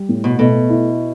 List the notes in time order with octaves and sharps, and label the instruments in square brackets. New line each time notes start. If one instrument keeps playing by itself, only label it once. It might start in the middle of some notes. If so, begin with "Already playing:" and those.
Already playing: [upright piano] G3
A2
[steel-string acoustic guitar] B2
[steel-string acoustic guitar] B2 [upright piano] A3
[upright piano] E4